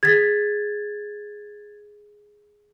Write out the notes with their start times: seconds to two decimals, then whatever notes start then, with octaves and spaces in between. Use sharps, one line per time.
0.03 G#4 G#6 A6 B6